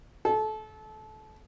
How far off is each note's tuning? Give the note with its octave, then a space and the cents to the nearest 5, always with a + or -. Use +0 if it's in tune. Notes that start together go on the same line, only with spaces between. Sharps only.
A4 -25